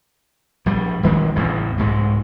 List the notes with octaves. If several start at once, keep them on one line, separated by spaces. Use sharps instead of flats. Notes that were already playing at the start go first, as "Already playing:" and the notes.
A#1 G3
E1 D#3 G#3 C4
A1 E2 C#3
C2 G#2 G#3